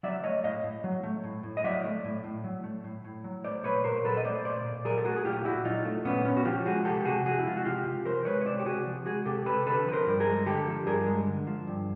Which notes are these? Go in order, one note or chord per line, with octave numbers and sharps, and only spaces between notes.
F#3 D5 E5
A3 C#5 D#5
A2 D#5 F5
A2
F#3
A3
A2
A2
D#5
F#3 D5 E5
A3
A2
A2
F#3
A3
A2
A2
F#3
A3 C5 D5
A#2 B4 C#5
A#2 A#4 C5
F#3 A4 B4
D#5
A3 C5 D5
A#2 C5 D5
A#2
F#3 G#4 A#4
A4
A3 F#4 G#4
G#4
A#2 F4 G4
A#2 E4 F#4
F#3 D#4 F4
A3
A#2 B3 C#4
A#2 B3 C#4
F#4
F3 F4 G4
G#3 F#4 G#4
C3 G4 A4
A4
C3 F#4 G#4
F3 F#4 G#4
E4
G#3 F4
F#4
C3 F4 G4
C3
F3 A#4 C5
G#3 B4 C#5
C#5
C3 C5 D5
G4
C3 F#4 G#4
F3
G#3 F#4 G#4
C3 G4 A4
C3 A4 B4
D3 A4 B4
F3 B4
A#4 C5
G2
G#4 A#4
G#3
D3 G4 A4
F3
G2 G#4 A#4
G#3
D3
F3
G2